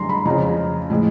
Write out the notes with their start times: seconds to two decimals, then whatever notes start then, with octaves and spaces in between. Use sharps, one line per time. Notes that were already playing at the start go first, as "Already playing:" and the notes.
Already playing: F#2 D3 G3 A#5 C6
0.09 B5
0.25 F2 C#3 F3 A#5
0.90 A2 F3 G#3